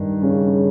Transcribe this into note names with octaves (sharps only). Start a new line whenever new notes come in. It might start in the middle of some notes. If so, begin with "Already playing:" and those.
Already playing: G2 D#3
C#3 C#4